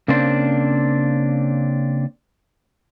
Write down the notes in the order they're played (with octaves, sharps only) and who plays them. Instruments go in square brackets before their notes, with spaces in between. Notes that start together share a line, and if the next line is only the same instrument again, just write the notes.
[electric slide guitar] C#3 A#3 C4 D4 C5